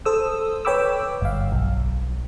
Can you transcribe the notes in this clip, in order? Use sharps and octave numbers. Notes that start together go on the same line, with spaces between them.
A4 C5 D#6 E6
B4 C#5 G5 B5 D6 E6
G1 F5
B1